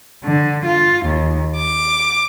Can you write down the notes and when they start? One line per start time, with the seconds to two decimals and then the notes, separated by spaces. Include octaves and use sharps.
0.25 D3
0.64 F4
1.06 D#2
1.56 D6